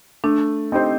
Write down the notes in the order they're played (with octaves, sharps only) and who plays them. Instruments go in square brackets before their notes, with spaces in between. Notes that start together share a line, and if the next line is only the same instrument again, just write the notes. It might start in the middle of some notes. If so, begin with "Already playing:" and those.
[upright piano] A3 [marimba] D4
[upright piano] C4 D#4 G4 C5